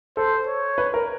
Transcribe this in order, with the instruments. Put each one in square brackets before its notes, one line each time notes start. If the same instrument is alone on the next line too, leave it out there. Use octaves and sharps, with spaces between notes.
[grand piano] A4 [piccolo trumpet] C5
[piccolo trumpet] C#5
[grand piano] B4
A#4